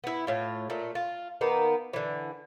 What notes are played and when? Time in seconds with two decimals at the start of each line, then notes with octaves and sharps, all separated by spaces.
0.04 B3 E4
0.27 A2 F4
0.70 A#2 A3
0.95 F4
1.41 D#3 A#3 B3
1.93 D3 E3